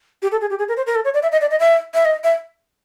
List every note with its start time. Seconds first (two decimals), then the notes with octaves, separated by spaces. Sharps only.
0.22 G4
0.32 A4
0.41 G#4
0.50 G4
0.59 G#4
0.68 A#4
0.77 C5
0.87 A#4
0.95 A4
1.04 C#5
1.14 D5
1.23 E5
1.32 D#5
1.41 D5
1.51 D#5
1.60 E5
1.94 E5
2.05 D#5
2.24 E5